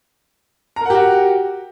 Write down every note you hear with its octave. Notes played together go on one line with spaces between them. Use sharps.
F#4 G4 A#4 F#5 A#5